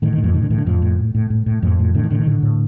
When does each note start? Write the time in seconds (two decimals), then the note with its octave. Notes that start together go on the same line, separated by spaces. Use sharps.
0.02 A2 D#3
0.13 D#3
0.18 A2
0.24 F2 F3
0.34 A2 D#3
0.43 D3
0.50 A2 D#3
0.58 D3
0.66 F2 A2 F3
0.82 A2
0.99 A2
1.15 A2
1.30 A2
1.46 A2
1.62 F2 A2 F3
1.79 A2
1.94 A2 D3
2.04 D#3
2.11 A2 D3
2.20 D#3
2.27 A2 D3
2.43 A2